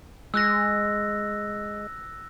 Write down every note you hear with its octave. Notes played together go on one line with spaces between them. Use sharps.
G#3 E6 F#6 A#6